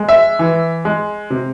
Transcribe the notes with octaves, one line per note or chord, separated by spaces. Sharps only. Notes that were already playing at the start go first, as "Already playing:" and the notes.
Already playing: G#3
E5
E3
G#3
C3